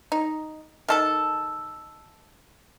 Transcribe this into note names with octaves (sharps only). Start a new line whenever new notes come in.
D#4
D#3 A4 A5